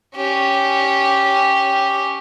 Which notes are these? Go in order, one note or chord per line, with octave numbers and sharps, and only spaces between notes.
C#4 G4